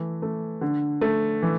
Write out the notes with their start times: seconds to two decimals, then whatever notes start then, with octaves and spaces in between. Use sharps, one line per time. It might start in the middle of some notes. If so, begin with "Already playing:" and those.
Already playing: E3 A3
0.22 A3
0.61 D3
1.01 A3
1.42 E3